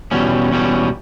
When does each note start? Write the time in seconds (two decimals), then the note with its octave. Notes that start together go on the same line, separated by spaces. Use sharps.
0.11 E2 B2 G3 C#4
0.52 E2 B2 G3 C#4